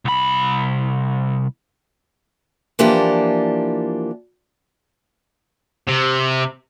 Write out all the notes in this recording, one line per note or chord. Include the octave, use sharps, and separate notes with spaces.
C2 B5
E3 F3 A#3 D4 G4
C3